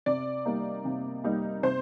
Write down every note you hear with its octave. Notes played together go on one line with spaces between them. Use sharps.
C3 D5
G3 A#3 D#4
C3
G3 A#3 D#4
C3 C5